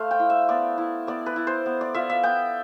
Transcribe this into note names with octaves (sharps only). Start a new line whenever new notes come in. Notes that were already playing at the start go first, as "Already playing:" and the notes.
Already playing: A3 C5 F5
G5
E4
E5
B3 D5
E4
B3 D5
B4
E4
C5
B3
D5
F4 E5
E5
B3 G5